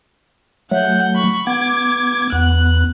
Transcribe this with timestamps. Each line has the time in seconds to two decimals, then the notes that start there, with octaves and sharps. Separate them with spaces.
0.72 F#3 A3 F#5 G6
1.15 B5 C#6
1.47 B3 D6 G#6
2.33 E2 B3 F#6